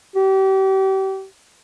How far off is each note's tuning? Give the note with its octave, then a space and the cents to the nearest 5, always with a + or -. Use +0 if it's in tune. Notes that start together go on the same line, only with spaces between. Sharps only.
G4 -35